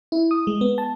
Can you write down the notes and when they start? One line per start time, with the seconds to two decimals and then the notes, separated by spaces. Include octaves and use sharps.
0.12 E4
0.31 D#6
0.47 G#3
0.61 B3
0.78 A5